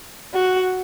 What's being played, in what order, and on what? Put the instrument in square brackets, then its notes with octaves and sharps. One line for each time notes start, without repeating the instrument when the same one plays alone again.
[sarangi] F#4